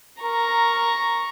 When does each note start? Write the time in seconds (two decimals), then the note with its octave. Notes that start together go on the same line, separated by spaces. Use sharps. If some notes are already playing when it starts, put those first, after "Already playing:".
0.23 A#4 A#5 C#6